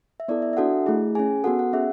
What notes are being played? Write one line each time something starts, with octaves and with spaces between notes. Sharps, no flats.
E5
B3 E4 A4 D5
E5
E5
D4 F#4 A4 F#5
A3 E4 G#4
C#4 G#4 G#5
B3 F#4 A4 F#5
F#5
C#4 G#4 E5